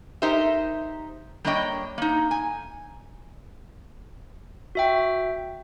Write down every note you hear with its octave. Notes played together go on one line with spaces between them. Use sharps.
D#4 G4 A#4 C5 E5
G3 A#3 D4 C#5 D#5 G5
A#3 D#4
G#5
F#4 E5 G5